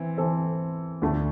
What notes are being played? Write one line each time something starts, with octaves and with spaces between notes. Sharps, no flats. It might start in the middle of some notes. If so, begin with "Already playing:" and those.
Already playing: E3 C4
E3 C4 A4 C5
D2 D3 A3